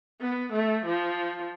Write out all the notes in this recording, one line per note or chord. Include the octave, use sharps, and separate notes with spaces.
B3
A3
F3